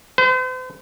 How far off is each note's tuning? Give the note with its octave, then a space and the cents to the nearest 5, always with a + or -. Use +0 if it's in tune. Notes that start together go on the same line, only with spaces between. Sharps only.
C5 -45